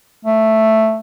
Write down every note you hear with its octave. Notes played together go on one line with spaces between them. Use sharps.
A3